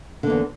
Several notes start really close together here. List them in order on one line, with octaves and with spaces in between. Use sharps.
D3 A#3 E2